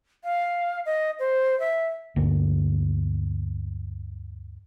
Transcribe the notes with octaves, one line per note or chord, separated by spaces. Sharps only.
F5
D#5
C5
E5
D2 G2 D3 A#3